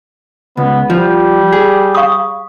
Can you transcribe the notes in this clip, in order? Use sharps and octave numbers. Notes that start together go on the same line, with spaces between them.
C#2 B3
F3 G3
G#4
F5 C#6 D#6